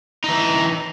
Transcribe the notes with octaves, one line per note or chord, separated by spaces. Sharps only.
E3 D#4